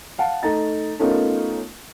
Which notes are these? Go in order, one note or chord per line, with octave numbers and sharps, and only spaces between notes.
F5 F#5 A5
A3 D#4 A#5 A6
A3 B3 C#4 D#4 F4 A#4